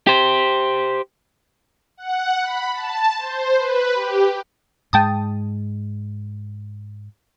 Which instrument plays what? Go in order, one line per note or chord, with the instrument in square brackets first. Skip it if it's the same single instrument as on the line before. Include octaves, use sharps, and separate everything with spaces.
[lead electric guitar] G4 C5
[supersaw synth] F#5
B5
A5
C5
B4
G4
[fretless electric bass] G#2 G#3 [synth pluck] G5 A5 D#6